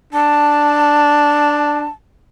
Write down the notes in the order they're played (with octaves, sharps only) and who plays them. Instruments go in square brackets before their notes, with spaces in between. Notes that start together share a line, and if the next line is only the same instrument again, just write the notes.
[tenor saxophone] D4 [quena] A5